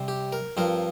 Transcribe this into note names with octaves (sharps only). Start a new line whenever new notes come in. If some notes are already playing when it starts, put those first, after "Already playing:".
Already playing: C3 G3 C4
G4
A#4
G2 F3 C4 A#4